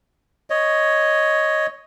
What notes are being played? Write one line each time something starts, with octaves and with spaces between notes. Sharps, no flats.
C#5 D#5